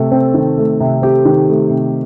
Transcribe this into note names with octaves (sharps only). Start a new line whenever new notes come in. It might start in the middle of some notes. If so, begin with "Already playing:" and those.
Already playing: C3 A3 A4
C4
D#3
A3
C3
C4 G4
D#3
A3
C3